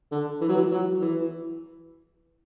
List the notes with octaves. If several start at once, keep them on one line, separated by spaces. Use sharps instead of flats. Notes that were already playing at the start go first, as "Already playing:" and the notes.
D3
E3
F#3
E3
F#3
E3